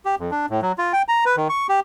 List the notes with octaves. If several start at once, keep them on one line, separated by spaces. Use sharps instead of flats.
G4
F2
D4
A2
F#3
F4
G5
A#5
B4
D#3
C#6
G4